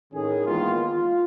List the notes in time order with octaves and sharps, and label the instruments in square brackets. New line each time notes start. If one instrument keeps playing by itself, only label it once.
[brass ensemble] A2 D#3 C#4 G#4
D#3 E3 G#3 A#3 B3 F4
F4